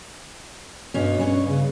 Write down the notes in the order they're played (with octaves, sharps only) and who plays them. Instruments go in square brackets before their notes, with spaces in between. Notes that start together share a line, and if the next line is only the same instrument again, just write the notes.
[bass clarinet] G2 [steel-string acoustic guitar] B2 C#4
[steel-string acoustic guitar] G2 B3 C#5 [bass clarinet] C#4
[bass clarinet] C#3